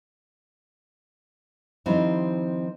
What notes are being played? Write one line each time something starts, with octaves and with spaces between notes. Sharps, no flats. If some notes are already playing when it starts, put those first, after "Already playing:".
D#3 F3 G3 C4 E4